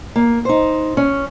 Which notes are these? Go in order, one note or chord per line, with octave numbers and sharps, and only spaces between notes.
A#3
D#4 C5
C#4